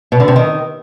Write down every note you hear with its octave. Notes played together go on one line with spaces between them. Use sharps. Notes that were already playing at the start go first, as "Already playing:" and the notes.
B2
D3
C3
D#3